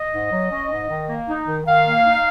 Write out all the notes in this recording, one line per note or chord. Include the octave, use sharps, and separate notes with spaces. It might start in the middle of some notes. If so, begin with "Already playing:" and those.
Already playing: D#5
G#2
F#3
C#4
G#2
D#3
A#3
D#4
D#3
D#3 F5
A#3
D#4